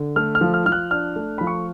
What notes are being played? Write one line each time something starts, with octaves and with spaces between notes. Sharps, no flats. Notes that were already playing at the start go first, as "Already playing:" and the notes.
Already playing: D3
A3 F6
F6
F3
F6
F3 F6
F#6
D4 F6
A3
F3 B5
C#6